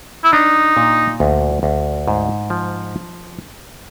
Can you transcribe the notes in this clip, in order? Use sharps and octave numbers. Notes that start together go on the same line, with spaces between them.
E4
D4 D#4
A#2
D2
D2
G#2
F3